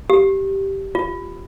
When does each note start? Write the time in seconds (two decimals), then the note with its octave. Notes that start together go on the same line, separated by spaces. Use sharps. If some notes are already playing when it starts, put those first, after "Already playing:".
0.10 G4
0.95 F4